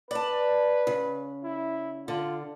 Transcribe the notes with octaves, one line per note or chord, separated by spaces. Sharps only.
B4 D5 A5
C#3
E4
D3 F4